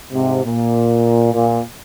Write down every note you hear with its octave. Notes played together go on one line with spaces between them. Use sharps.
G#2 C3
A#2
A#2